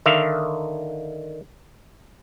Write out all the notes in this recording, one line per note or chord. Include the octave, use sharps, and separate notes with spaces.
D3 D#3 E5 F5